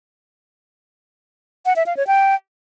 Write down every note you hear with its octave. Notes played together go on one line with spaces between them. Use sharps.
F#5
E5
F5
C#5
G5